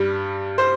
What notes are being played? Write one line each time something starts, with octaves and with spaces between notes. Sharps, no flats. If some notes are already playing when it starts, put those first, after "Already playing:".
Already playing: G2 G3
C5